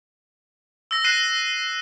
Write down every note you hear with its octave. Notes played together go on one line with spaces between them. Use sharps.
E6 A#6
F#6 A#6 C7 D#7 E7